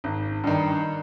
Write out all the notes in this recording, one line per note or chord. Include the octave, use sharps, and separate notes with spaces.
G#1
G2 D#3